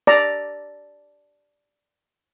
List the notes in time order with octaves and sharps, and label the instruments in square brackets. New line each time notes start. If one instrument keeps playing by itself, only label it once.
[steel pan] D5 A#5